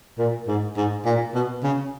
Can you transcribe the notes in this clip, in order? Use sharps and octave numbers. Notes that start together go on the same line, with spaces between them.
A#2
G#2
G#2
A#2
B2
C#3